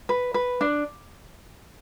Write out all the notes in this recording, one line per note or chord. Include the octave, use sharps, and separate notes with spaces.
B4
B4
D4